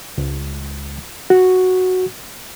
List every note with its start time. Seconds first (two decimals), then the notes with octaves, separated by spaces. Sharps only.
0.18 C#2
1.30 F#4